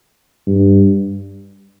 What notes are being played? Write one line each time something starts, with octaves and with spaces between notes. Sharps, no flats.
G2